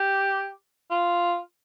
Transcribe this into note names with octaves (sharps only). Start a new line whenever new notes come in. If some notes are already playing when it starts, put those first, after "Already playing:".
Already playing: G4
F4